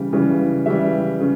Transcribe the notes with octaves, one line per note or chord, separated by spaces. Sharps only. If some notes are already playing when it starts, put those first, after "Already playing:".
Already playing: C#3 E3 G3
C#3 E3 G3
C#3 E3 G3 E5
C#3